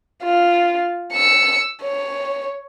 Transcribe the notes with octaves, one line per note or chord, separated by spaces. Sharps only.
F4
E6 C#7
C#5